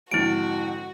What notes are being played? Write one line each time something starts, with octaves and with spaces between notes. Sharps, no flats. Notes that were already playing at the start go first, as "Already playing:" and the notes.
F2 G#2 D3 E4 F#4 D7